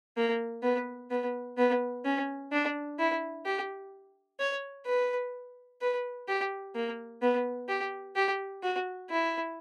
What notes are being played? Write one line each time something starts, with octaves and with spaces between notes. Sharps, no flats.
A#3
B3
B3
B3
C#4
D4
E4
G4
C#5
B4
B4
G4
A#3
B3
G4
G4
F#4
E4